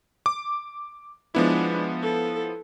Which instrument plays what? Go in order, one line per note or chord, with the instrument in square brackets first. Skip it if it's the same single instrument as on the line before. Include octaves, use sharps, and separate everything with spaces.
[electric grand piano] D6
[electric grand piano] F3 B3 E4 [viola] G#3 D4
[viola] A4